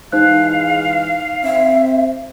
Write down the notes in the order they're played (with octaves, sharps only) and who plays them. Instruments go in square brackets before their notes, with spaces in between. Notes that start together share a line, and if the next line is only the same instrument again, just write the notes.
[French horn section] E3 G#3 [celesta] D#4 C5 F#6 [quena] F5
[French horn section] C4 [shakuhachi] E5